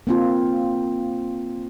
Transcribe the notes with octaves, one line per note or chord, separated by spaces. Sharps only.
A#3 C4 F4